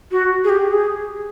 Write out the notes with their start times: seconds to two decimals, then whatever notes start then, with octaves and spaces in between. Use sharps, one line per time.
0.11 F#4
0.44 G#4
0.49 G4
0.68 G#4